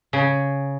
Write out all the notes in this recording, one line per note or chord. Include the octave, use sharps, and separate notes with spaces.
C#3